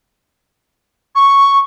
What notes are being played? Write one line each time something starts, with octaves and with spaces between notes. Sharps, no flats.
C#6